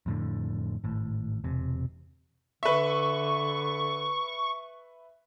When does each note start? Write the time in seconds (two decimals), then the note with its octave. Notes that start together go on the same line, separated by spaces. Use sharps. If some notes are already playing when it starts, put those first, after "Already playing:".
0.06 F2 A2 D3
0.84 G#1 A2
1.44 E1 C3
2.63 D3 B4 E5 C#6